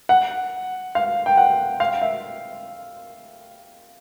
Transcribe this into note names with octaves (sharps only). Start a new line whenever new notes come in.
F#5
F5
G5
F#5
F5
E5